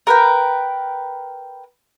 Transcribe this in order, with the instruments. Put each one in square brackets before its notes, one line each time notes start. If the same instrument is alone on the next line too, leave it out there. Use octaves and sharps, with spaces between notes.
[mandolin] A#4 B4 G5